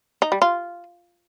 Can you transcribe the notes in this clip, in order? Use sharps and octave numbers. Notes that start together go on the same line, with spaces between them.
D#4
G3
F4